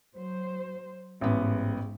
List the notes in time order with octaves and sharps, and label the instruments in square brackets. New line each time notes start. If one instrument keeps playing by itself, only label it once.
[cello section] F#3 C5
[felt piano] A1 B3 [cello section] G#2